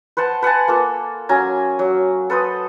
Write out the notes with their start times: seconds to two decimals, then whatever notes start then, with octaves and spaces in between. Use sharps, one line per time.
0.17 B4 C5 F#5 A5
0.42 B4 F#5 G#5 A5
0.68 A#3 F4 A4
1.29 F#3 C#4 G#5 A#5
1.79 F#3
2.30 A4 B4 C5 D#6